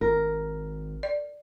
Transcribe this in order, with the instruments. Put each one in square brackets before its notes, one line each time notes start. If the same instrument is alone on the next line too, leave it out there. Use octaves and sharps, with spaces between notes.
[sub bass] G#1 [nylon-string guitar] A#4
[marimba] D5